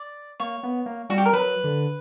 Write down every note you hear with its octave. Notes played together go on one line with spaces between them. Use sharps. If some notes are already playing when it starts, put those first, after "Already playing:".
Already playing: D5
A#3 C#5
B3
A#3
G3 F#4
G4
A#4
F#3 B4
D3